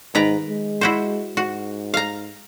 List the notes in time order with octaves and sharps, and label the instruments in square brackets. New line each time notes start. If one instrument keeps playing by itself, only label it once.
[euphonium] G#2 [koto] D#3 B4 A#5
[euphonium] G#3
[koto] E4 F#4 C5
[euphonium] G#2 [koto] F#4
[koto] F5 A#5